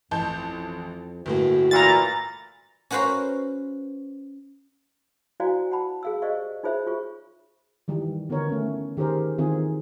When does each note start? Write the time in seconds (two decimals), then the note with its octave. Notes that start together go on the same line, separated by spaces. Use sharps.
0.11 A1 F2 A5 G6
1.26 G1 A2 A#3 F#4
1.71 A#2 E3 F4 A#5 A6
2.91 C#4 F#4 B4 C5 F5 A#5
5.40 E4 F#4 C5 D5 F5 G#5
5.72 F#5 A5 B5
6.03 G#4 F5 E6
6.22 G4 C5 D5 D#5 F5 C#6
6.63 D#4 F4 G#4 C5 C#5 E5
6.87 F4 G4 G#4 C#6
7.88 D#3 E3 G3
8.29 D3 B3 D#4 F4 A#4 C#5
8.49 A3 C#4
8.97 D#3 G4 G#4 A#4 C5
9.38 D#3 E3 C4 F4 G#4